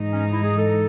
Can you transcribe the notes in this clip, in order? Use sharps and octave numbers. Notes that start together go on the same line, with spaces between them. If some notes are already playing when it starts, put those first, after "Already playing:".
Already playing: G#2 E3 G#3 D#4
C#4
E4
G#4
A4